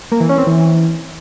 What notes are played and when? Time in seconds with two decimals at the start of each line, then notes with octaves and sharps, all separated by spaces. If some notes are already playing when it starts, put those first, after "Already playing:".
0.12 A#3
0.20 E3
0.29 C#4
0.38 C4
0.47 E3